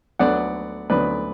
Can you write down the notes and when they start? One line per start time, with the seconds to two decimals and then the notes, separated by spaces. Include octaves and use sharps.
0.19 D2 D3 F#3 B3 D5 F#5
0.90 D2 D3 F#3 B3 B4 D5